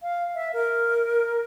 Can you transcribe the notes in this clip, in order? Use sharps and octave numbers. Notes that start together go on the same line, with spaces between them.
F5
E5
A#4